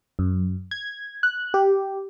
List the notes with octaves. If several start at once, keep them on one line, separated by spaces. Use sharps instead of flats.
F#2
G#6
F#6
G4